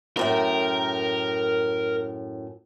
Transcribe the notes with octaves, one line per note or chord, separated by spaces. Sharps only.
F#2 A2 A#4 G5